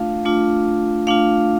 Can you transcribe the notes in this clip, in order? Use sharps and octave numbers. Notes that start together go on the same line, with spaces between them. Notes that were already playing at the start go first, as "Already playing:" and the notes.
Already playing: A3 D4 F4 F5
A3 D4 F4
A3 D4 F4 F5